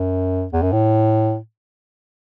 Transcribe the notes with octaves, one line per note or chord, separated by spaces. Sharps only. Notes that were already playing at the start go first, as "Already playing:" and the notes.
Already playing: F#2
E2
F#2
A2